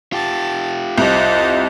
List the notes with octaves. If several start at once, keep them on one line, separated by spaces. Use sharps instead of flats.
F4 G4 A5
C2 C5 D#5 A5